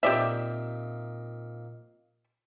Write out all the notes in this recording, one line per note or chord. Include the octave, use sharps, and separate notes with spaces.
A#2 C4 D#4 G4 D5 E5